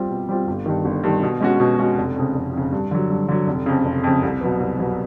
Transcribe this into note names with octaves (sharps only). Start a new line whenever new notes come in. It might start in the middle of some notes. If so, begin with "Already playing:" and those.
Already playing: G3 C4 F4
B2
G3 C4 F4
G1
G2 D#3
G1
G2 D#3
B2
G#3 C#4 F#4
B2
G#3 C#4 F#4
F1
F2 C#3
F1
F2 C#3
G2
D3 F#3
G2
D3 F#3
F1
F2 C#3
F1
F2 C#3
C2
B2 F#3 B3
C2
B2 F#3 B3